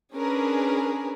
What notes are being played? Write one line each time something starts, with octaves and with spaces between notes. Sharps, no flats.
C#4 D4 G#4 A#4 B4